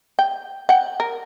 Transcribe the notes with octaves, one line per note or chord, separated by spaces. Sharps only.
G5
F#5 G5
A#4